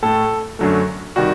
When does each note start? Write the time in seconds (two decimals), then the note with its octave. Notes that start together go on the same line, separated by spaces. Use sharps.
0.03 A2 A3 A4
0.59 F#2 D3 F#3 A3
1.16 C3 D#3 G3 F#4